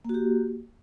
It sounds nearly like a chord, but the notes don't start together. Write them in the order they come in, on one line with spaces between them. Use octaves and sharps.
A#3 F#4 G4